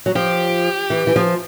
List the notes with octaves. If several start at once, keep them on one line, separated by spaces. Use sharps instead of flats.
F#3
F3 G4
E3
E3
F3